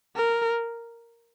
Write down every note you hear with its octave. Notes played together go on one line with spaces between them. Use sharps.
A#4